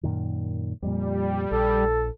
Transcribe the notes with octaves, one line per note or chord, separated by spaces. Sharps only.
F#2 A#2 D#3
F2 A#2 G3
A#1 A4